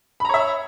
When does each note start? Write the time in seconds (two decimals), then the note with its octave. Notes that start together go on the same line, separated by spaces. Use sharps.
0.20 B5
0.25 A#5
0.29 C#5
0.34 E5